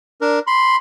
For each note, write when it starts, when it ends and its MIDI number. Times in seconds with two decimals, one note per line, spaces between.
0.21 0.39 62
0.21 0.39 70
0.47 0.76 83
0.47 0.76 84